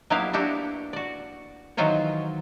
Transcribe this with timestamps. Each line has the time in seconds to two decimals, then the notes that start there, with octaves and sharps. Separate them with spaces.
0.10 F#3 A#3 B3 E4 G4 F5
0.33 D4 E4 F#4 G4
0.93 F#4 D5
1.77 D#3 E3 F#3 F4 C5 C#5